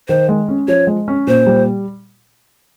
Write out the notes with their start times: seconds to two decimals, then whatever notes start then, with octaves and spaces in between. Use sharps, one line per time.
0.08 D#3 C5
0.29 G#3
0.48 C#4
0.68 F3 C#5
0.87 G#3
1.08 C#4
1.27 A#2 C5
1.46 G3